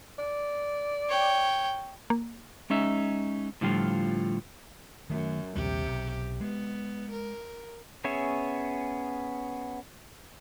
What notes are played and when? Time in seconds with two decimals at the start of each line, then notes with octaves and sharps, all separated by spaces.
0.19 D5
1.09 C#5 G5
2.10 A#3
2.70 G#3 C#4 D#4 E5
3.61 A2 D3 F3 G3 F4
5.10 F#2 D#3 A3
5.55 A#1 D#2 C3 G3 G4
5.86 B1
6.41 G#3 B3
7.12 A#4
8.04 B3 C#4 G#4 C#5 E5